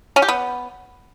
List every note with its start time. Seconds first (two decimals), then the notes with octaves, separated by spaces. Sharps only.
0.16 C#4
0.22 G4
0.28 B3